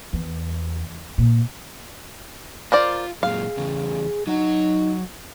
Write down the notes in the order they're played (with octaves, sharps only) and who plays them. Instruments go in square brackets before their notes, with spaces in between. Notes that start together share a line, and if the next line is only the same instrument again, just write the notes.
[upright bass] E2
A#2
[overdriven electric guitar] F4 [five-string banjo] A#4 C5 D5
[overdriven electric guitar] F#2 A#2 [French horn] G#4 [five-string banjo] F5
[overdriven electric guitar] E2 C#3
[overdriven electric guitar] F#3 F#4 [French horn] D#4